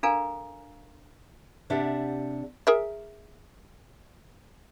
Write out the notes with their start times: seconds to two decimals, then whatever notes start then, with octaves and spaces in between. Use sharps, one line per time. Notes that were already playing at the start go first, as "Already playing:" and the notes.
0.03 D4 A4 A#4 F5 G#5 A#5
1.70 C3 D4 G4 D5 E5 F#5
2.67 G#4 A#4 E5